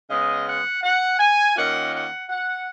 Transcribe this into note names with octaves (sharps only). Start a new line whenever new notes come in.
C#3 G#3 B3 D#5
F#5
F#5
G#5
D#3 A#3 C#4 F4 F#5
F#5
F#5